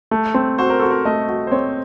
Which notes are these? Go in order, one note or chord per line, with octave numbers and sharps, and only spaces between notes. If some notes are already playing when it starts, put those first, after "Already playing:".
A3
C4
F#4 C5
A#4
F#4 A4
A#4
A3 D#5
F#4
C5
C4 C#5